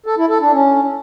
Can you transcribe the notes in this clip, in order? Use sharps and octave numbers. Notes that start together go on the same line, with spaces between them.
A4
E4
A4
D4
C#4